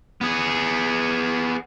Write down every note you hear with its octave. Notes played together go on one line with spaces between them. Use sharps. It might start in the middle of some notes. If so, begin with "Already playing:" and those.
B3 G#4